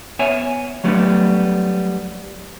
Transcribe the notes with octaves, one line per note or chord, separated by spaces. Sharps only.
B3 C#5 E5 G#5
F#3 G3 A3 B3 C4 D4